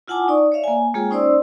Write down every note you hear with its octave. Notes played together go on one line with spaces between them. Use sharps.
E4 F4 F#5 G#5 A5 D6
D#4 D5 C#6
C#5 D5 E5 F5
A#3 G#5
G#3 A#3 F4 G#4 C#5 G5
C#4 D#4 C5 D5 C6 E6